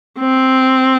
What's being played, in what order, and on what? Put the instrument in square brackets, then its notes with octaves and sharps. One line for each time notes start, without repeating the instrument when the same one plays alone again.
[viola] C4